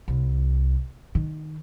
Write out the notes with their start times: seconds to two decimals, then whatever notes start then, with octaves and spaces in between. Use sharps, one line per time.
0.08 C2
1.15 D#3